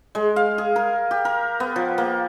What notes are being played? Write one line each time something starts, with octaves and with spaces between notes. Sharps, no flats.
G#3
F5
G#4
A#4
G4
A#4
B3
F3
A#3